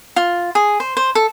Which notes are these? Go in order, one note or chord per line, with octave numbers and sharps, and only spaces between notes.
F4
G#4
C5
C5
A4